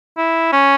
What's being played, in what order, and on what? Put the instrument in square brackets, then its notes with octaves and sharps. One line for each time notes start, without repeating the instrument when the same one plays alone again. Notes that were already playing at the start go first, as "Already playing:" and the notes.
[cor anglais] E4
C#4